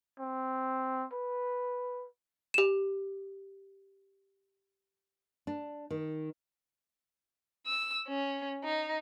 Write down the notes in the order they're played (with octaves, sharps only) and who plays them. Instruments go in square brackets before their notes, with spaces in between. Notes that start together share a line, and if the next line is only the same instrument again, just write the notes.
[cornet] C4
B4
[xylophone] G4 E7
[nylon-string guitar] D4
D#3
[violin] E6
C#4
D#4